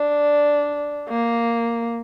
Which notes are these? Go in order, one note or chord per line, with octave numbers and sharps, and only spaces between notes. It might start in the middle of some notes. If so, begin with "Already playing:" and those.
Already playing: D4
A#3